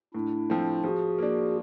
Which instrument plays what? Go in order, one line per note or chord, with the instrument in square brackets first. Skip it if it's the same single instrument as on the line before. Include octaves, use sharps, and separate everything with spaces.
[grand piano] A2 [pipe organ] D4 E4
[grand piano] F3 A3 C4
[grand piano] F3 [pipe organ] F#4 G#4
[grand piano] A#3 D4